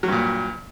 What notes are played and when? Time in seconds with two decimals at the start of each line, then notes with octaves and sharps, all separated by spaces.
0.03 F#3
0.08 G2
0.12 A#2